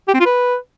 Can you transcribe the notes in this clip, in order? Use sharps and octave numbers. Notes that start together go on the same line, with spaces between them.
G4
C4
F4
B4